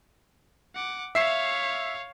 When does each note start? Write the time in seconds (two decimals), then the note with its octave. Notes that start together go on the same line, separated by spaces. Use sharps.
0.75 F#5 D6
1.15 C#5 E5 F5 C7 E7